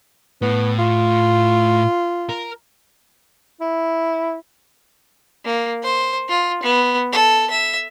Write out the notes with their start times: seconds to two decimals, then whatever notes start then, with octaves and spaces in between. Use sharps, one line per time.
0.42 A2 B3
0.79 F4
2.29 A#4
3.61 E4
5.45 A#3
5.83 C5
6.29 F4
6.63 B3
7.12 A4
7.50 E5